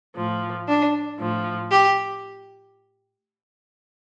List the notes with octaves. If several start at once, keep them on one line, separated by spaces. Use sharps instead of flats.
A2 F3
D4
A2 F3
G4